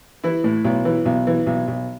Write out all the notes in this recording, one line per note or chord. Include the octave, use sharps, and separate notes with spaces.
E3 E4
A2
B1
E3
B1
E3
B1
B1